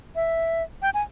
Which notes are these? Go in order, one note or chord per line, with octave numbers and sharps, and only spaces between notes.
E5
G5
G#5